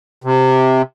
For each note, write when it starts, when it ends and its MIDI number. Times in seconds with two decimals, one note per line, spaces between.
0.24 0.82 48